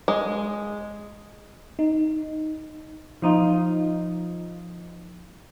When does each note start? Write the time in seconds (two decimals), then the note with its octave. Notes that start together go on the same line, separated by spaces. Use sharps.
0.08 G#3
1.79 D#4
3.22 F3 D#4 F4